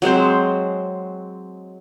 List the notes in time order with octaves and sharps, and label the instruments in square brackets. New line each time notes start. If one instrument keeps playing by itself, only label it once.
[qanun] F#3 G#3 C4 C5